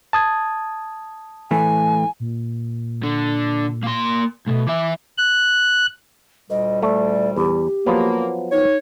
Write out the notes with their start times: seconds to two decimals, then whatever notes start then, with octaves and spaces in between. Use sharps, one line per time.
0.13 A5 D#6 G#6
1.51 A2 E3 A3 G#5
2.20 A#2
3.03 D3
3.83 A#3 C6
4.47 C2 B2 A3
4.67 E3 E5 D6
5.18 F#6
6.50 D2 A#2 G3 D#5
6.83 A3 D5
7.36 E2 G4
7.87 F3 F#3 A#3 B3
8.52 D#4 C#5